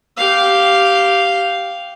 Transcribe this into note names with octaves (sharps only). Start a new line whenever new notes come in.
G4 F5